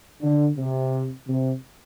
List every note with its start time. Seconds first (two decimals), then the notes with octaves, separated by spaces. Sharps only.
0.22 D3
0.58 C3
1.28 C3